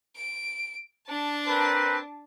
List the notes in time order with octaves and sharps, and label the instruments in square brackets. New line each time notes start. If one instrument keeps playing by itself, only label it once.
[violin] D7
D4 A5
[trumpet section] C4 A#4 B4